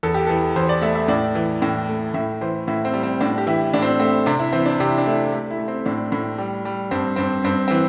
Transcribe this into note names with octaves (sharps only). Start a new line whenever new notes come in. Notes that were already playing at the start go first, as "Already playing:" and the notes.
E2 A4
G4
E3 A4
E2 C5
D5
A3 E5
E5
A2 D5
E3
A2 G5
A3
A2 E5
E3 C5
A2 E4
C4
G3
C4
A2 D4
G4
E3 E4
A2 D4
C4
A3 C4
C3 D4
E4
E3 C4
D4
C3 G4
E4
D4
A3 E4
A3 G4
E4
A3
C4
A2 D4
A2
G3
G3
G2 C4
G2 C4
G2 C4
E3 C4